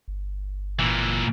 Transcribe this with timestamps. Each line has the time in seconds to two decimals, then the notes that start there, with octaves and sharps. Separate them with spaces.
0.08 G1
0.79 A#2 E3